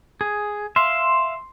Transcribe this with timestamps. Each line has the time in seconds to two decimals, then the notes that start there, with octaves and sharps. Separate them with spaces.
0.21 G#4
0.76 E5 F5 C6